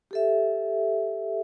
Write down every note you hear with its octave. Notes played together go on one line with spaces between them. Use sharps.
G4 A4 E5